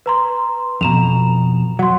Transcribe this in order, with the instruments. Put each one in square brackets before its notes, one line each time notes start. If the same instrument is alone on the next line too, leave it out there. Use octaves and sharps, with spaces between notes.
[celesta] B4 A#5 C6
[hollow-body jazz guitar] F2 B2 [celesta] A#5 E7 F7
[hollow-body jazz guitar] F#3 [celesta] F#5 C6